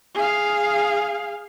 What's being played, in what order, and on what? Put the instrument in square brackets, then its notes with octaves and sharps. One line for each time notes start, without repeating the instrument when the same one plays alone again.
[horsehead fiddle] G#4 F5